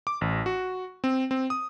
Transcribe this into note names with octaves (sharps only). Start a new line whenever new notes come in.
D6
A1
F#4
C4
C4
D#6